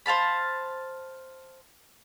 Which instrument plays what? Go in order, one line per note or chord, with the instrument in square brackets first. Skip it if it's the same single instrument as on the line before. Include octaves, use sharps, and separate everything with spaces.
[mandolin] C5 F5 A5 B5